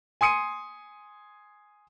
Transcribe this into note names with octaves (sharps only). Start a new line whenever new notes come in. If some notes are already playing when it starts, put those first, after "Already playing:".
G#5 C6 D#6 C#7 D#7